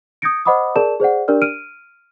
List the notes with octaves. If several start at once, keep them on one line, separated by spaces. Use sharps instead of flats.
D#6 G6 G#6 A#6 C#7 D7
C5 D#5 F#5 B5 D6 D#6
G#4 A#4 D5 A5 E7
G#4 C5 D5 F#5
D4 G4 A#4 D5 F6
F6 D7 D#7